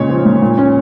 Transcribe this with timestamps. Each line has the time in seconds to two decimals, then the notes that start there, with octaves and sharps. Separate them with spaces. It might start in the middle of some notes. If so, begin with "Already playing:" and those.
Already playing: A#2 C#3 G#3 C#5
0.09 F3
0.25 A#2
0.42 A#2
0.57 C#4